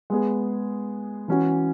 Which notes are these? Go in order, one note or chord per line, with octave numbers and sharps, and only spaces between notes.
G#3 B3 G#4
E3 C#4 F#4